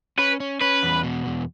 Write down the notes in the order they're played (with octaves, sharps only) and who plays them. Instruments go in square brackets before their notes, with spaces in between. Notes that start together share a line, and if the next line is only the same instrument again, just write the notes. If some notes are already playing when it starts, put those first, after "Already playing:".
[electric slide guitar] C#4 [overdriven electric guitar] B4
[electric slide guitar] C#4
[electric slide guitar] C#4 [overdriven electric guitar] B4
[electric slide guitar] E2
B2
E2